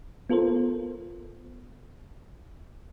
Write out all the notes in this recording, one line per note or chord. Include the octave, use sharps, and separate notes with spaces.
B3 F4 A4 A#4 C5